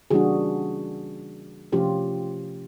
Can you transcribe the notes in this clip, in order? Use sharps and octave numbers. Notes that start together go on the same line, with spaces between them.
C#3 E3 G3 A#3 D4 F#4 G#4
C3 F3 A3 C#4 F4 G4